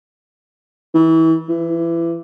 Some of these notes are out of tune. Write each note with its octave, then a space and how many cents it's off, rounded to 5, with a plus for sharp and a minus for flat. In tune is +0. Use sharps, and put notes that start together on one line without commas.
E3 -30
E3 +25